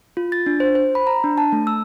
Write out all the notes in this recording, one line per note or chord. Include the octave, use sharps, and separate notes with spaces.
F4
A6
D4
C5
C5
B5
A#5
D4
A5
A3
E6